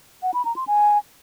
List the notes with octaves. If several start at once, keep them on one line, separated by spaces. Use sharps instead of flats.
F#5
B5
A#5
C6
G#5